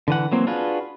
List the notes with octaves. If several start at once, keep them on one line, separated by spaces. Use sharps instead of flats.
D3 E3 F#5
E3 F#3 A#3 C4
D4 F4 F#4 G#4 B4